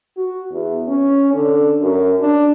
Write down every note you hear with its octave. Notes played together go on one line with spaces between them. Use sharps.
F#4
E2
C#4
D3
F#2
D4